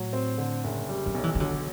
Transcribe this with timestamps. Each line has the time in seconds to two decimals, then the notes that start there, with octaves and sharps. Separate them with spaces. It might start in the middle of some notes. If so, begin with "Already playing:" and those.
Already playing: A2 F#3
0.13 C4
0.38 D3
0.64 F#1
0.89 G3
1.06 F#3
1.14 B1
1.23 E3
1.35 E3
1.40 D3 F#3